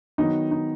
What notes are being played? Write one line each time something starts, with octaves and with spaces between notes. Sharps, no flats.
D#3 F#3 B3 D#4
D#4